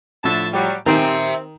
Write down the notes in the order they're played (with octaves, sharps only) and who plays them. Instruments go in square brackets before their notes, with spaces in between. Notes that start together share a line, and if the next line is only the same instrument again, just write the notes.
[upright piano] A2 F3 [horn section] D3 E5 A5
[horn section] F#3 G3
[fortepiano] D#3 [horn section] C4 [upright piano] G4 C5 G#5 [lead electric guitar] E5 A#5